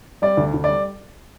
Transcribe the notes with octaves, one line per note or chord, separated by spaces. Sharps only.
G3 D5
D2
D2
G3 D5